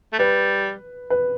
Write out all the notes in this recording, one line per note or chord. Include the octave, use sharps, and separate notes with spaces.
A3
G3 B4
B4